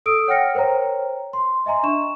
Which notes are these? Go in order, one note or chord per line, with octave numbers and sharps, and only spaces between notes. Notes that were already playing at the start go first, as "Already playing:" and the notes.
A4 D#6 E6 D7
C#5 F#5 G5 F6 A#6 C#7
A#4 C5 C#5 G5 A#5
C6
D#5 E5 G#5 A#5 C6
D4 C#6 E7